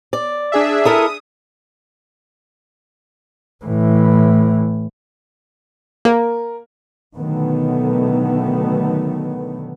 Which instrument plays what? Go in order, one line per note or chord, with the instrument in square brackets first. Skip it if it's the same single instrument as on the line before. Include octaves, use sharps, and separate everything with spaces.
[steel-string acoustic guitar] D5
[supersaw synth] D4 G#4 E5
[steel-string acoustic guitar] E4 A4 A#4 [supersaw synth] D#6
[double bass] A2 E3
[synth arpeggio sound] A#3 [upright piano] A#4
[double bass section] B2 D3 D#3 F#3 A3 B3